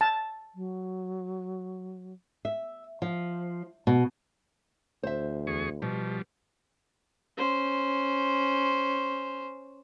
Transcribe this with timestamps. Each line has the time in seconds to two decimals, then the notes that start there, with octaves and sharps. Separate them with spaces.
0.01 A5
0.55 F#3
2.45 E5
3.02 F3
3.87 B2
5.03 D2 C5 E5
5.47 E2 G#4 C#6
5.82 B2 F3 G3
7.37 C#4 C5